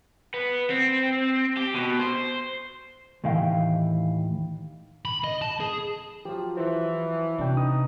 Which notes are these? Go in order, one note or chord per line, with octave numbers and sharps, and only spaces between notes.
B3
C4
G4
B2
C5
D#2 A2 D#3 E3 F5 G5
B5
D#5
A5
G#4
F3 F#3 F4 G4
E3 C5
C3 C#4 D4 F#4 C#5 G5
D#4 B4 D#6